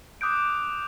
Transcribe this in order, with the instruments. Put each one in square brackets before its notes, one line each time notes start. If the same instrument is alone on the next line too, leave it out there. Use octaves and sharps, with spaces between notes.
[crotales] D6 D#6 F#6 G6 D7